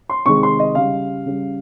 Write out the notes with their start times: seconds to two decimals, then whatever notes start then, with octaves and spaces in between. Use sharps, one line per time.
0.09 C6
0.26 C3 D#3 G#3 C#6
0.43 C6
0.60 D#5
0.75 C#3 G3 F5
1.26 C#3 G3